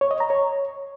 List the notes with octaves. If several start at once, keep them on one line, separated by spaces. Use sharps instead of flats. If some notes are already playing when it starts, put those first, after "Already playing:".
C#5
D#5
A#5
C#5